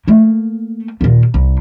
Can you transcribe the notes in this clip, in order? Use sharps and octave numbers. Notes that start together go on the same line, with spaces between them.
A3 A#3
D#2 A#2
C2